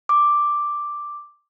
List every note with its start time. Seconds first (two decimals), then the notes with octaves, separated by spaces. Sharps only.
0.09 D6